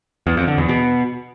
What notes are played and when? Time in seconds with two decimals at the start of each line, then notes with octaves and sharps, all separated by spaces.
0.27 E2
0.37 F2
0.48 D3
0.58 E2
0.69 B2